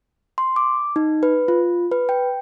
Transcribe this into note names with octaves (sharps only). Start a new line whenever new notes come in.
C6
D6
D#4
B4
F4
B4
G5